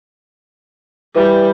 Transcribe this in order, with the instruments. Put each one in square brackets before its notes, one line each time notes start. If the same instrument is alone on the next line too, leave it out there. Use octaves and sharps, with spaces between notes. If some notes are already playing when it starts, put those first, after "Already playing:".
[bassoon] E3 [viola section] G3